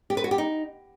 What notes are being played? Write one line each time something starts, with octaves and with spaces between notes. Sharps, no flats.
G4
B4
F#4
G4
D#4